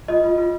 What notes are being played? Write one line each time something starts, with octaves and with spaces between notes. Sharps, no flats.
F4 D#5
F4
F4